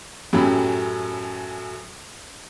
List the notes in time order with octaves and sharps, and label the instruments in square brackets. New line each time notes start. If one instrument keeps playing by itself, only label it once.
[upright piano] F#2 A2 F#3 C#4 G4 B5